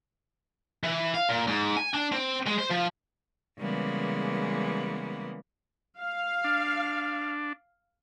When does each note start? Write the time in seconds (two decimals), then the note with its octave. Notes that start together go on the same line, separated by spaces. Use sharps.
0.84 E3
1.14 F5
1.29 A#2
1.47 G#2
1.77 G#5
1.94 D4
2.12 C4
2.47 G#3
2.59 C5
2.71 F3
3.58 C#3 E3 G3 G#3 A#3 B3
6.00 F5
6.44 D4